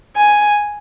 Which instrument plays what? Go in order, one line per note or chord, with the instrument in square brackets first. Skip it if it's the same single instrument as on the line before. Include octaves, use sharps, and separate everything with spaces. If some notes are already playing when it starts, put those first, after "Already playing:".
[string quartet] G#5